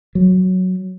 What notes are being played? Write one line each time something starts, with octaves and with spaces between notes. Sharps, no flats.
F#3